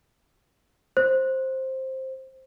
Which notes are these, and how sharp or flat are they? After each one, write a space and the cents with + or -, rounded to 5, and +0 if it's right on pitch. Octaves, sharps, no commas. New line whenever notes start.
C5 +10